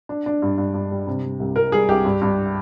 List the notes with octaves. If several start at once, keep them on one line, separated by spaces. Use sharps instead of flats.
D4
D4
G2
G2
G2
G3
C3
G3
C2
C2 A#4
G3 G#4
C2 G4
G2
G2